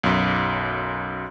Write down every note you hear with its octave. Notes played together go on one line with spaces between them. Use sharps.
B1 F#2